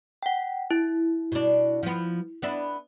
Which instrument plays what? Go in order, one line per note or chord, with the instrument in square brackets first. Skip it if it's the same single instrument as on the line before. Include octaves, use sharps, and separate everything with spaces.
[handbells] F#5 G5
E4
[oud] B2 D4
F3 B3
B3 D4 E4